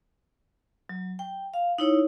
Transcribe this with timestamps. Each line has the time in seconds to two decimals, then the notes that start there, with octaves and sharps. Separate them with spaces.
0.89 F#3
1.19 G5
1.54 F5
1.78 D#4 E4 C#5